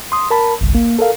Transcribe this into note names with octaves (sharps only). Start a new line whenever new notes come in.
C6 D#6
A#4 A5 B5
G1 C2
A#3
A4 A#4 F5